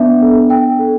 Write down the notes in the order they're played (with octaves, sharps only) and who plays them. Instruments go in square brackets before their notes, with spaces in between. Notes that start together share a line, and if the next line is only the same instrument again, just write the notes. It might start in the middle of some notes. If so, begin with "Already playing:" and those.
Already playing: [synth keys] B3 D4 [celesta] E5
[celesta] A4
G5
A4